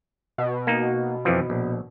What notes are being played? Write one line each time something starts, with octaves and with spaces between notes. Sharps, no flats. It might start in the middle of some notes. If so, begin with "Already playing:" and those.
B2
A#3 D#4
F2 E3 F3
A#1